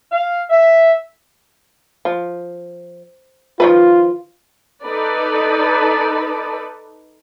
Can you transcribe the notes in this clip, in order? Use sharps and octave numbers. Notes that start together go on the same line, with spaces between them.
F5
E5
F3
D#3 F3 F4 B4
D#4 A4 B4 D5